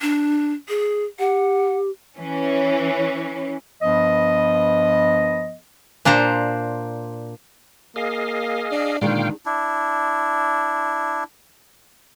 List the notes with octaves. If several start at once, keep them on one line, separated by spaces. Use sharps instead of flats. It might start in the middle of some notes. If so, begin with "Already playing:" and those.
D4
G#4
G4 F#5
E3 C#4
G2 F3 B3 D#5
A#2 D4 C5 A#5
A#3 G#4 D#5 F5
D4
A#2 D3 D#3 G#3 D4 F5 G5
D4 E4